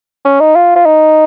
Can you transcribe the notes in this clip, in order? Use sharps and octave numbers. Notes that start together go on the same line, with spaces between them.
C#4
D#4
F4
F4
D#4